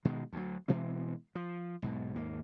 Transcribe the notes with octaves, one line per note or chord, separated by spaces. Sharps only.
B2 D#3 G#3
D2 F#3
B2 E3 G#3 C4
F3
B1 G#2 B2
D#2 G#2 A#3